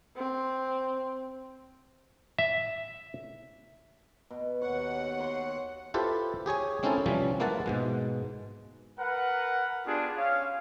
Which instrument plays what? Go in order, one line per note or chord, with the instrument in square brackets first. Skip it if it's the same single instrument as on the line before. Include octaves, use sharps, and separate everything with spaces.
[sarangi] C4
[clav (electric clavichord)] E5
[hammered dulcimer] B2
[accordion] D#2 F#5 [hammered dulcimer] C#5
[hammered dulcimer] C#5 C6
[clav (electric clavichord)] E4 F4 G4 A4 B4 C5
G4 G#4 C#5 G#5
G#3 C4 C#4 D#4 E4 A4
C3 E3 F3 G3 C#4
G#3 A#3 E4 B4 F#5 A5
G#2 B2 G#3
[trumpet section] A#4 B4 F#5
B3 D4 F4 G4 G#4
C#4 F5